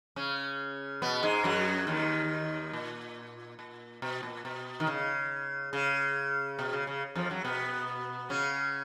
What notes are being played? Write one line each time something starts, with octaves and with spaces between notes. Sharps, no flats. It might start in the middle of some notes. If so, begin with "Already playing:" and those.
C#3 C#4
B2 B3
G#2 G#3
F#2 F#3
D#2 D#3
A#2
A#2
B2
A#2
B2
D#3
C#3
C#3
B2
C#3
C#3
F2 F3
F#2 F#3
B2 B3
C#3 C#4